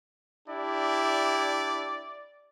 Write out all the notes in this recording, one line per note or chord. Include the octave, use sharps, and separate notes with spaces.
D4 E4 G4 D5